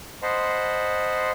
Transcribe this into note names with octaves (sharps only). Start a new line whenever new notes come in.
C5 D#5 F#5 A5 B5 C6